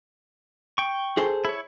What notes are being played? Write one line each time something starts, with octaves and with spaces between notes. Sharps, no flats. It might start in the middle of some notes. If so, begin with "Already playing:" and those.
G5 C#6
G#4 A4 C5
E4 C#5